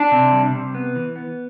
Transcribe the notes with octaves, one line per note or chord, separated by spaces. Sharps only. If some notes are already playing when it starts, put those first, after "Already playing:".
Already playing: D4
C3
G3
C3
B3
E3
B3